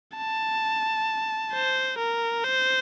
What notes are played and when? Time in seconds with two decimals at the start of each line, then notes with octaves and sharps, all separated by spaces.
0.17 A5
1.53 C5
1.99 A#4
2.44 C5